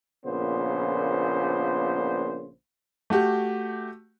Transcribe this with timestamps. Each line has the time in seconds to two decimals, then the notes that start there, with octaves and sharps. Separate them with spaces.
0.25 A#1 A#2 C#3 B3 C5
3.10 A3 F#4 G4